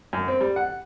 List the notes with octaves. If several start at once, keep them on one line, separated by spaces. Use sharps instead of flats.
F#2
C4
G3
F#5